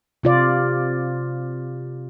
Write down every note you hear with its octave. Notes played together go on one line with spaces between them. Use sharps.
C3 F4 D5